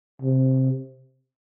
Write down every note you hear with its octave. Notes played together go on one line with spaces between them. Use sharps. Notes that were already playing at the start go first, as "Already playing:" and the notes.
C3